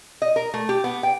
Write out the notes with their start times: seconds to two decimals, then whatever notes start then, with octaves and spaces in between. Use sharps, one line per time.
0.22 D#5
0.36 A#4
0.54 A3
0.69 G4
0.84 B3
1.03 G5